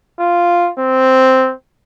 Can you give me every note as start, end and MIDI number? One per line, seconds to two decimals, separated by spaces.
0.20 0.70 65
0.79 1.53 60